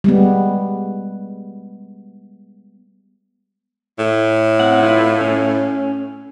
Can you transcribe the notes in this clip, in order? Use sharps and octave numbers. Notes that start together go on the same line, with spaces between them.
G3 G#3 B3
A2
C4 F#5
E4 F4 B4
C#4